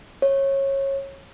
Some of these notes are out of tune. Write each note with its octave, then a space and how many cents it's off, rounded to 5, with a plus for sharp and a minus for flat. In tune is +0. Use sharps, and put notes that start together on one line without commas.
C#5 -20